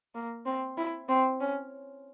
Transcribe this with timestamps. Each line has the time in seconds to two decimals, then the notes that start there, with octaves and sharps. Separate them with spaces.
0.15 A#3
0.46 C4
0.78 E4
1.09 C4
1.40 C#4